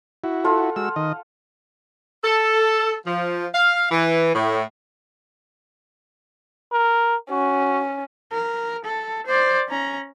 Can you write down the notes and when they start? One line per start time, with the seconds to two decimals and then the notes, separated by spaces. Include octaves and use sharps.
0.24 E4 F#4
0.44 F4 A4 F#5
0.76 G#3 F#4 E6
0.96 D#3 D#5
2.24 A4
3.07 F3
3.54 F5
3.91 E3
4.34 A2
6.72 A#4
7.30 C#4 F#4
8.32 A#4
8.85 A4
9.27 C5 D5
9.69 C#4 A#5